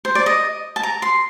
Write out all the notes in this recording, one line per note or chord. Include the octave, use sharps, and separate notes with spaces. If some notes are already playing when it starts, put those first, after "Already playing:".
C5
D5
D#5
A5
A#5
C6